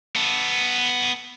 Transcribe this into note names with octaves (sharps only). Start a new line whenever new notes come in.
B3 A4